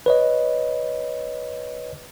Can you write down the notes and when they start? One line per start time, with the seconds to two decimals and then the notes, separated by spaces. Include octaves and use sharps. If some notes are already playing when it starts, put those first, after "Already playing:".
0.06 B4 C#5 D#5